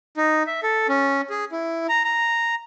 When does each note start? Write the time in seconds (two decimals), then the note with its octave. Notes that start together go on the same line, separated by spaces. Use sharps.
0.17 D#4
0.47 E5
0.63 A4
0.89 C#4
1.30 G#4
1.52 E4
1.89 A#5
2.04 A#5